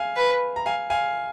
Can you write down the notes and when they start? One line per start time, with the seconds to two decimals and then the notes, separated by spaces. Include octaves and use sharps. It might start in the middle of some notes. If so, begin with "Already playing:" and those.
Already playing: F5 G#5
0.17 B4
0.56 A#5
0.66 F5 G#5
0.90 F5 G#5